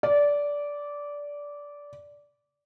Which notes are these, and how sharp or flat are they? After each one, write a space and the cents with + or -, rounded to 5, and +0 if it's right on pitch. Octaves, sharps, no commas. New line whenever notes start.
D5 -15